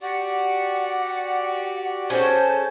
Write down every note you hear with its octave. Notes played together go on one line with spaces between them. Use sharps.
F#4 G4 D5 F#5
C#4 G#4 A4 C5